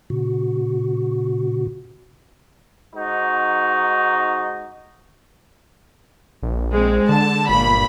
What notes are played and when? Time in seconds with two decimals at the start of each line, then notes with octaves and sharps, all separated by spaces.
0.10 A#2 C#3 F#4
2.95 G#2 D#4 F#4
6.43 A#1
6.72 G#3 C4
7.09 D3 A5
7.49 G1 A#2 B5